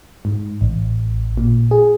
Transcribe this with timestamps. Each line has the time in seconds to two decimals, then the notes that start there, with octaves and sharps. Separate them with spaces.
0.25 G#2
0.61 A1
1.37 A#2
1.71 G#4